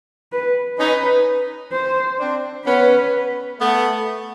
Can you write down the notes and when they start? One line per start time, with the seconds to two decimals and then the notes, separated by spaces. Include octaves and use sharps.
0.33 B4
0.79 C#4 D#4 B4
1.73 C5
2.19 C4 D4
2.66 B3 C#4 B4
3.60 A3 B3